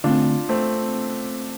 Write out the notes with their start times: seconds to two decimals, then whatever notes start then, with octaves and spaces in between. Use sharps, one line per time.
0.04 D3 A3 C4 D4 F4
0.49 A3 C4